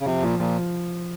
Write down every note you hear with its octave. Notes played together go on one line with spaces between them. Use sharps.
C#3
C3 F3
A#2 F3
A#2 F3